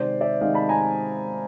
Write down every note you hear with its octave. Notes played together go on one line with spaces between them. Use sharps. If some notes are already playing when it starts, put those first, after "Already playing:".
Already playing: C3 D#3 G#3 C5 D5
D5 E5
C3 D#3 G#3 D#5 F5
A5 B5
G#5 A#5